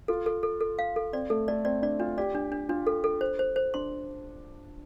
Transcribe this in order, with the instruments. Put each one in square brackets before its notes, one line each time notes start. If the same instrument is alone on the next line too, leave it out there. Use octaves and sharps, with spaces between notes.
[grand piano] F4 [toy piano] A4
[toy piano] A4
A4
A4
F5
A4
[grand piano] C4 [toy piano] D5
[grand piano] A3 [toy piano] A4
[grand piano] A3 [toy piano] D5
[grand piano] C4 [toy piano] D5
[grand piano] D4 [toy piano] D5
[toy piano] D4 [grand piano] F4
[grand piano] G4 [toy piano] D5
[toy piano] D4
D4
[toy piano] D4 [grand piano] F4
[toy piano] A4
A4
C5
C5
C5
[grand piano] D4 [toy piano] C6